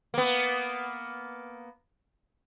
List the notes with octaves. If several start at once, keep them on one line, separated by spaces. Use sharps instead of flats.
A#3 B3